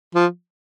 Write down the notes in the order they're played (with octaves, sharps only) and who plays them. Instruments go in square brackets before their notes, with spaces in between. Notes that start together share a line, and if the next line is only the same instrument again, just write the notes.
[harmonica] F3